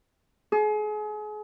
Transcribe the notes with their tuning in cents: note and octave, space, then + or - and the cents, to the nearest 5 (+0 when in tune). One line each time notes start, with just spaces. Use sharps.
G#4 +35